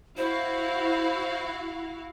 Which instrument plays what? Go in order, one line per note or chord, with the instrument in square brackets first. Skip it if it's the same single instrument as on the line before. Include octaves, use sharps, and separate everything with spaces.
[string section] E4 F#4 F5 [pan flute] C5